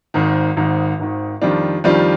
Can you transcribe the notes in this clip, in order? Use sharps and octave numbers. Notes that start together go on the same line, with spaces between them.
G#1 G#2 D#3
G#1 G#2 D#3
G#1 G#2 D#3
F2 D#3 G3 D4 F4
F2 D#3 G3 D4 F4